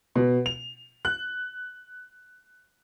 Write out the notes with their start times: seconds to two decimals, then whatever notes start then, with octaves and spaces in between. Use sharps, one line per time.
0.16 B2
0.46 F7
1.05 F#6